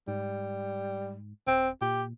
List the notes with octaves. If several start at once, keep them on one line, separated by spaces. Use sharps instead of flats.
G#2 G3
D#1 C4
A#2 G4